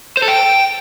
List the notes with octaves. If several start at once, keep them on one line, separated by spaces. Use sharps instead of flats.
C5
A4
G5